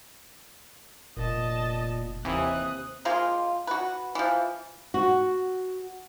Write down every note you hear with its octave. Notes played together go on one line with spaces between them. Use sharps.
F1 A#2 D#5 A5
D#2 C3 E3 D#6 F#6
F3 G#3 A#3 F4
F#4 B4
E3 F3
F#4